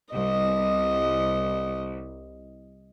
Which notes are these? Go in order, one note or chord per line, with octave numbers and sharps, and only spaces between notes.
C2 D#5